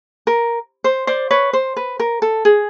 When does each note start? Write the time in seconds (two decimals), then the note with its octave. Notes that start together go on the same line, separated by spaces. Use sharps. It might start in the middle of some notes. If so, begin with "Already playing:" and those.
0.27 A#4
0.84 C5
1.07 C5 D5
1.30 B4 C#5
1.53 C5
1.76 B4
2.00 A#4
2.22 A4
2.45 G#4